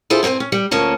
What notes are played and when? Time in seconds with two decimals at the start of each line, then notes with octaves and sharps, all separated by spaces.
0.10 D3 E4 F4 G#4 A4 C5
0.23 G2 C4 G#4 C5 G#5
0.40 C#4
0.52 G3
0.71 D2 F3 A#3 C#4 A5